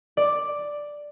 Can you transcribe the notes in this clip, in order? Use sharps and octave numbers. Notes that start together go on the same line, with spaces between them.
D5